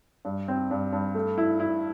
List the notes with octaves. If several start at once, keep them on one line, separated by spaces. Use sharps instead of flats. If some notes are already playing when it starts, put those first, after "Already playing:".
G2
C4
G2
G2
A3
E4
E4